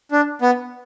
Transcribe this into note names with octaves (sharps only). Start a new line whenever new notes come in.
D4
B3